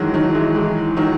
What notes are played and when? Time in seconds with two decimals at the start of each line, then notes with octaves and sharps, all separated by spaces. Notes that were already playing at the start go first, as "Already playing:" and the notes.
Already playing: D#3 E3 F#3 G#3
0.14 D#3 F#3
0.35 E3 G#3
0.55 E3 G#3
0.97 D#3 F#3